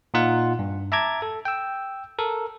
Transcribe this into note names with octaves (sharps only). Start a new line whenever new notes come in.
A#2 D#4 F4 F#5
G2
E5 A5 A#5 D6 G#6
A4
G5 E6
A4 A#4